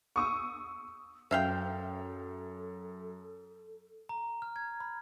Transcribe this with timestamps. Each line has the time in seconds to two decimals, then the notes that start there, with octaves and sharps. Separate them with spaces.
0.16 C#6 D#6 E6
1.31 F#2 A4 E5 F5 G5
4.09 A#5
4.42 F6
4.56 G#6
4.80 B5